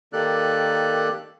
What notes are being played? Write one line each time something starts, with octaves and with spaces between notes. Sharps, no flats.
D#3 A#3 G4 A4 D5 F#6